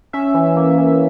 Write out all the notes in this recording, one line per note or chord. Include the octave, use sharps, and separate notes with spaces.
C#4 E5
E3
A#3
E3